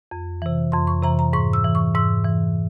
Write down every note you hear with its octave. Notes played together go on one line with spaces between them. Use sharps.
F2
C3 E3
F2 C6
C#6
C3 E3 A#5
A#5
G#2 C#6
E6
E3
C#6
G#2 E6
E3